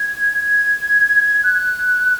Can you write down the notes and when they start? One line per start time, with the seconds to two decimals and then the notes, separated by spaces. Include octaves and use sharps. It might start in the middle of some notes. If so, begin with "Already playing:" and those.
Already playing: G#6
0.41 G#6
1.44 F#6